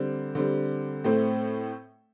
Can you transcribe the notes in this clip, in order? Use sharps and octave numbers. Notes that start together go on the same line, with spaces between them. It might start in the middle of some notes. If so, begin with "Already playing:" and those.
Already playing: D3 G3 C4
D3 G3 C4
A2 A3 C4